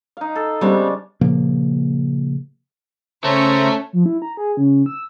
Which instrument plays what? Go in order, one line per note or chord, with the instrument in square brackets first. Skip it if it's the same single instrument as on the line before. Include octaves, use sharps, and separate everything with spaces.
[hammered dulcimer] D#4 F5
A4
[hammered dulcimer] C#3 G#3 D4 [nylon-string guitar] G3 B3 C4
[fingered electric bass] A#2 C#3 F3 A#3
[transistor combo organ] C#3 [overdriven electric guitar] A3 [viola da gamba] C#4 C#5 [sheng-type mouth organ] C5 E5 A#5
[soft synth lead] F3
E4
A#5
G#4
C#3
E6